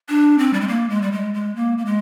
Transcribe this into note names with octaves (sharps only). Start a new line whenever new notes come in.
D4
C4
G3
G#3
A#3
G#3
G3
G#3
G#3
A#3
A#3
G#3